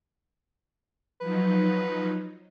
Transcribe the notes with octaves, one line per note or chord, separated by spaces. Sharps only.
F3 F#3 D#4 B4